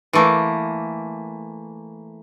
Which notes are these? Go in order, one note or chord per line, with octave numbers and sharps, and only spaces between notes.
E3 A3 A#3